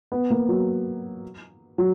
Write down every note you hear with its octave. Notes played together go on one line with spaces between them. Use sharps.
B3
A#3
F#3
F#3